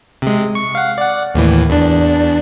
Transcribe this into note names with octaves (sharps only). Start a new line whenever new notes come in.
C3 G#3
C#6
F5 F#5
D5 F#5
D#2 A2 E3
E2 D4